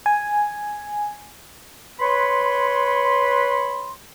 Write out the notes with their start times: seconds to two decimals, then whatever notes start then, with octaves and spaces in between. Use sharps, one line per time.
0.06 G#5
2.00 B4 C#5 B5 C6